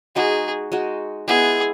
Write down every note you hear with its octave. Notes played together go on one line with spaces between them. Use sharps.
G#3 D#4 F#4 G#4
G#3 D#4 F#4
G#3 B3 E4 G#4